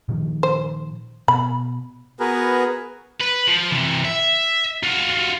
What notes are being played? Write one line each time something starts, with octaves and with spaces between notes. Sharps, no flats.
A#2 D#3 F3
C5
B2 B5
B3 F#4 G#4 A#4 B4
B4
F3
C3 E3
E5
F4 F#4